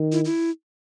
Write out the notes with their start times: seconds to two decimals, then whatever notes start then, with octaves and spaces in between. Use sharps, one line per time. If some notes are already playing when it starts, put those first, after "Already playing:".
Already playing: D#3
0.12 E4
0.25 E4